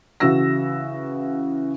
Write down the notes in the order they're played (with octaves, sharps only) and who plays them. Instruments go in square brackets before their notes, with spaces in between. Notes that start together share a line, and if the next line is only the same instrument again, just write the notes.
[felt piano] C#3 E3 F#4 E6 A#6